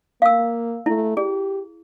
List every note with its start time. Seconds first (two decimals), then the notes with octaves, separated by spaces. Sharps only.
0.22 A#3 F5 E6
0.86 A3 E4
1.17 G4 G#4